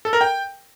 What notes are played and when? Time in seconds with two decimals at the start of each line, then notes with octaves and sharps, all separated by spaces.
0.05 A4
0.13 A#4
0.21 G5